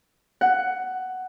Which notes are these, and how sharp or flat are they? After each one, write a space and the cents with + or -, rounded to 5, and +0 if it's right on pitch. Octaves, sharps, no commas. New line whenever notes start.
F#5 +10